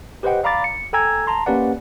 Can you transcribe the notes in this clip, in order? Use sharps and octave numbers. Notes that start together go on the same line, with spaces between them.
G4 B4 C5 D#5 F#5 G5
D5 F5 A#5 B5 D6 A6
C#7
A4 G5 G#5 A#5 E6 G#6
A5 A#5 C6
A#3 C#4 G4 B4 D5 F#5